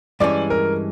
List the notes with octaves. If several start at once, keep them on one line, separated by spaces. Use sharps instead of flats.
G2 E3 G#3 C#4 D5
A#4